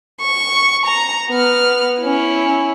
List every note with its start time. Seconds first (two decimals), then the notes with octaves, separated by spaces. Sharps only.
0.21 C#6
0.86 A#5
1.30 B3 F6
2.00 C#4 E4